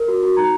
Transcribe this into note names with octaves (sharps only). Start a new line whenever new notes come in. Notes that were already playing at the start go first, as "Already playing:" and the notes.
Already playing: A#4
F#4
F#4
D#4 A#5